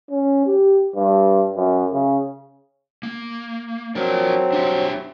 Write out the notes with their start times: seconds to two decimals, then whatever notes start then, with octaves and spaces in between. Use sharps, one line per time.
0.10 C#4
0.46 G4
0.96 G2
1.56 F#2
1.92 C#3
3.03 A#3
3.95 F#3 C4 D4 A#4
4.52 D4 G4 E5